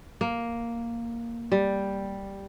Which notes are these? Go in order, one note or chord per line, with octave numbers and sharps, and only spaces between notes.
A#3
G3